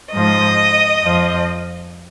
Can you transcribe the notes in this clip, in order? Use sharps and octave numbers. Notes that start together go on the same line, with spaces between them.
G#2 F3 D#5
F2 F3